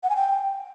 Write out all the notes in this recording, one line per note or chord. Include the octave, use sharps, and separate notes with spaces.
F#5
G#5
G5